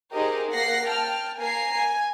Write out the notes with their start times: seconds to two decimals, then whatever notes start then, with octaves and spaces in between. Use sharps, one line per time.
0.14 D#4 G4 G#4 A#4 C5 D#5
0.52 A#3 F#5 A#6 C7
0.87 G5 A5 F6
1.37 A#3 G#5 A#5 C7
1.76 G#5